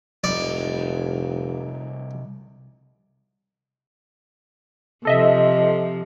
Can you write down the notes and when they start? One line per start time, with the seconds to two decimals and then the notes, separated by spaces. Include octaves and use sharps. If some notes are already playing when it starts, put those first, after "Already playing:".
0.24 F1 C2 D#4 D5
5.05 C3 F3 A4 D#5 E5